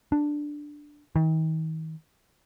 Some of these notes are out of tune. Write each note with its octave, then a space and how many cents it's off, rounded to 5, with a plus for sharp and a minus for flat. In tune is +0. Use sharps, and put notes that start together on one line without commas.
D4 +5
D#3 +40